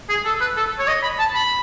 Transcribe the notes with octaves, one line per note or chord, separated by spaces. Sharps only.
G#4
A4
B4
A4
C#5
D#5
B5
A5
B5